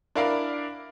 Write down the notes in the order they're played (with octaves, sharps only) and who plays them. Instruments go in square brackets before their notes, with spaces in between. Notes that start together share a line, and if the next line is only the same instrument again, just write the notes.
[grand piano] D4 E4 A#4 D5 F5 B5